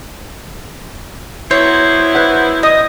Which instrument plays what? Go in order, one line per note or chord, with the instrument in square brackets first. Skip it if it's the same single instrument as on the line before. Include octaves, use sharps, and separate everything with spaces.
[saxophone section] F#3 B3 E4 [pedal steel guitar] C5 [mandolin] C#5
[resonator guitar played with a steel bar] B4 F#5
[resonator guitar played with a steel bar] D#5 [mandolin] D#6